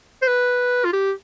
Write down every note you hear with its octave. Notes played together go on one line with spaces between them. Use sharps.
C5
B4
F4
G4